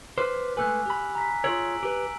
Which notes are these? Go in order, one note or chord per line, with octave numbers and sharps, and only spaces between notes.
B4 C5 D6 F6
G#3 A3 B4 G#5 E6 F#6
G4 B5
A#5 B6
F4 G#4 C#5 E6 D7 F#7
G4 B4 D7